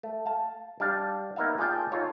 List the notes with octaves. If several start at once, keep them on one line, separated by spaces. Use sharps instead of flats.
A3
F5 A5
G3 D4 F5
A#3 B3 D#4 E5 F5
F4 G#4 D5 F5 G5 A5
D#4 F4 A4 C#5